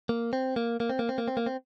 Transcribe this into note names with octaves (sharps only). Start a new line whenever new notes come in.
A#3
C4
A#3
A#3
C4
A#3
C4
A#3
C4
A#3
C4